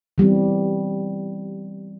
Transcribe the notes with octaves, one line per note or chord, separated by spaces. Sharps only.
E3 G3 B3 C4